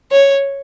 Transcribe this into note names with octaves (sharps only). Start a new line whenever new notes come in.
C#5